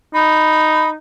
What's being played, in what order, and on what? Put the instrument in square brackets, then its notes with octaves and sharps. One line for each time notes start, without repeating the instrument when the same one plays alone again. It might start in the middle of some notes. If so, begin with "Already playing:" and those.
[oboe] D#4 [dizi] B5